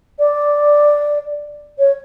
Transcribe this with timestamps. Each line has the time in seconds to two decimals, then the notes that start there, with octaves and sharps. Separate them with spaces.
0.19 D5
1.78 C#5